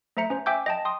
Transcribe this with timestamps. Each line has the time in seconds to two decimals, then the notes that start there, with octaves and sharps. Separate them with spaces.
0.17 A3 C5 E5 A#5 C#7
0.30 C#4 C5
0.46 E5 G5 G#5 D6 E6 G6
0.66 D#5 G5 A5
0.85 G5 C6 D#6